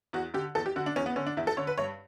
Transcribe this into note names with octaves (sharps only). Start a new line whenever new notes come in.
E2 F#4
D3 G4
E2 A4
G4
D3 F#4
D4
E2 C#4
B3
D3 C#4
D4
E2 E4
A4
D3 C#5
B4
G2 C#5